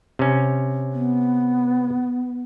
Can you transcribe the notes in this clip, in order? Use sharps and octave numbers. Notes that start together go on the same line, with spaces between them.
C3 C#4
B3